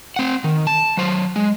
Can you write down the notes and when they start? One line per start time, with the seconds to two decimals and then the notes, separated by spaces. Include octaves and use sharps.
0.16 C4 F#5
0.44 D#3
0.67 A5
0.97 F#3 C5
1.36 G#3